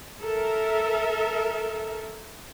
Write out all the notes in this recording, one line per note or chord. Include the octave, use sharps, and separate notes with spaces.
A4 A#4 E5